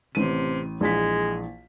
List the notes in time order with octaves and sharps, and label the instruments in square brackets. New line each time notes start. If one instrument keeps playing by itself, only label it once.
[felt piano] A1 D#7 [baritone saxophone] C3
[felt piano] A#1 E3 B6 [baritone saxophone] G#3